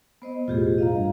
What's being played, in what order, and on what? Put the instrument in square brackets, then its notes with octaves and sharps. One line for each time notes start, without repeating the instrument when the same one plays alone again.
[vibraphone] B3 C5 D#5
[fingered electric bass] E1 A2 [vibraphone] F4 G4 G#4
[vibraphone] D#5 F5 A#5
[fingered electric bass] G2